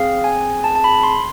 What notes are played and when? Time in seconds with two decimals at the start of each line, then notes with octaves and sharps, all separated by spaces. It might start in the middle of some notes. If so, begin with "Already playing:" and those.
Already playing: C4 G#4 F5
0.24 G#5
0.64 A5
0.75 A5
0.84 B5
1.03 C6